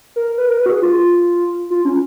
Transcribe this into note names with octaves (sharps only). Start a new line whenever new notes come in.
A#4
B4
A#4
B4
F#4
G#4
F4
F4
C#4